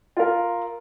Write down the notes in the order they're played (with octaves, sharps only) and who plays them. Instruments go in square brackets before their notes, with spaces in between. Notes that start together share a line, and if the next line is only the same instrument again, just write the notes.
[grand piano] F4 A#4